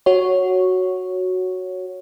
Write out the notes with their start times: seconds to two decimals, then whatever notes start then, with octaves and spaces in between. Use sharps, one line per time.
0.06 F#4 C#5